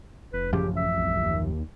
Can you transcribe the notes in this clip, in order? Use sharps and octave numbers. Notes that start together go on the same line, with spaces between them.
F1 B4
A1 F#2 C#3 F3 G4
E5
C2
D#2